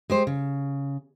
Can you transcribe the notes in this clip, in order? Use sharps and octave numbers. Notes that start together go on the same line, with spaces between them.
G#3 G4 C5
C#3